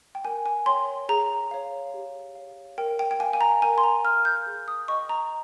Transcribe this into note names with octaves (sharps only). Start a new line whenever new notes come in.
G5
A#4 G#5
G#5
C#5 G5 C6
G#4 A#5
C#5 F5
G4
C#5 F5
A#4 G5
G5
G5
F5 G#5
G#5
A#5
A#4 G#5
C6
A#5
F5 F6
G6
G#4
D#6
D#5 G5 C#6
A#5